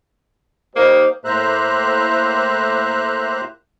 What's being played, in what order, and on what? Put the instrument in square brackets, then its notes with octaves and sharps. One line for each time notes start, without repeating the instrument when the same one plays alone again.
[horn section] G3 A#3 D#4 [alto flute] C5
[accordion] A2 A#3 C5 E5 A#5 F#6